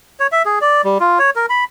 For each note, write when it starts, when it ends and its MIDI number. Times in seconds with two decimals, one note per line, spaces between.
0.20 0.27 73
0.32 0.42 76
0.45 0.59 68
0.61 0.82 74
0.84 0.98 55
1.00 1.19 65
1.19 1.30 73
1.36 1.46 70
1.50 1.64 83